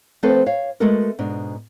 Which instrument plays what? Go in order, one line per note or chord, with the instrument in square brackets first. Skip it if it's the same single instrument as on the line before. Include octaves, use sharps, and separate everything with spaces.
[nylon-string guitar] F3 A3 C4 A4 B4 C5
C#5 F5
G#3 A3 B3 F#4 A4 A#4
G#2 B2 D4